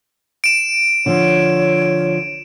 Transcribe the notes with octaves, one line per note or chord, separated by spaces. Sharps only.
D7 E7
D3 F3 C#5